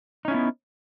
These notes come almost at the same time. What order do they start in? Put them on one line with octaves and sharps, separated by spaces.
D#4 C#4 E4 B3